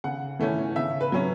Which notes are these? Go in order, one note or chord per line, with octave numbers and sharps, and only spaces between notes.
C#3 F#5
E3 A3 C#4
C#3 E5
B4
F#3 C#4